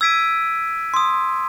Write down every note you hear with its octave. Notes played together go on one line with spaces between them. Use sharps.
E6 G#6 B6 D7 D#7
C6 D#6